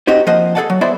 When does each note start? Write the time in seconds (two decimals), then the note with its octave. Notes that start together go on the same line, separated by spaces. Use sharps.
0.07 C4 D#4 F#4 G4 C5
0.27 F3 A#3 C5 D#5 F#5
0.55 G#4 A4 B4 D5 F#5 A5
0.70 F#3
0.81 B3 E4 G#4 C5 D5 E5